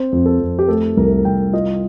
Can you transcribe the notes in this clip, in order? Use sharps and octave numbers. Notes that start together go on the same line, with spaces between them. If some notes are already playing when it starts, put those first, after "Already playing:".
Already playing: C4 C5
F2
A4
F2
G4
A3 A4
C2 A#4
C2 G5
F4 D#5